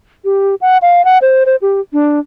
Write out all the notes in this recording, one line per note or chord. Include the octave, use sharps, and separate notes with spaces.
G4
F#5
F5
F#5
C5
C5
G4
D4